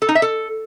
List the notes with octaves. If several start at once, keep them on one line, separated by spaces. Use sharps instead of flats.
A4
D#4
E5
A4